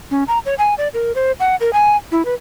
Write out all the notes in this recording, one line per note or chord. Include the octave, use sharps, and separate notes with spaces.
C#4
A#5
C#5
G#5
D5
A#4
C5
F#5
A#4
G#5
E4
B4